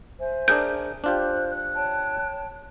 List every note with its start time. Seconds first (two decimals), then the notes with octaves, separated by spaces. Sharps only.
0.20 C5 E5 G#5
0.48 D4 G#4 A#4 G6
1.04 D4 F4 G4 C5 F#6
1.50 F#6
1.75 C#5 G5 A5